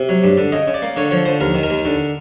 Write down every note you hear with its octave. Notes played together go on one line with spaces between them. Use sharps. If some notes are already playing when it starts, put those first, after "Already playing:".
Already playing: C3
F#3
G2
D3
C#3 D#5
C#3
D5
A#3
D3 C#5
F3 C#5
D3 C5
D#2 A#4
D#3
A#4
D#2
D3